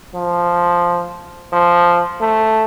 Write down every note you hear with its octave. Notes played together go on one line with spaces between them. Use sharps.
F3
F3
A3